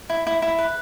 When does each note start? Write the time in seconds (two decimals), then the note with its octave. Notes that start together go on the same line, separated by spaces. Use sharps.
0.10 E4
0.27 E4
0.42 E4
0.58 B4